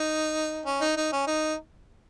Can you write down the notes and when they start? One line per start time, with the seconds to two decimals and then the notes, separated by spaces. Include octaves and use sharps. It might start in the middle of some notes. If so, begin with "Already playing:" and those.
Already playing: D#4
0.66 C#4
0.81 D#4
0.97 D#4
1.12 C#4
1.27 D#4